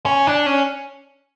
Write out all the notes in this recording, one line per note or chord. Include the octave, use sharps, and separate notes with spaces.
C#4
D4
C#4